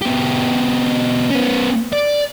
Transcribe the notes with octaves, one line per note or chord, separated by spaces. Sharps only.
B2 G4
B3 C#4
D5